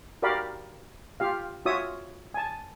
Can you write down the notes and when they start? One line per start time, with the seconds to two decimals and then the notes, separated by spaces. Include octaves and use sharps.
0.22 F#4 G4 A#4 D5 F5 B5
1.20 F4 G4 F5
1.66 F4 F#4 C#5 E5 D#6
2.34 G#5 A5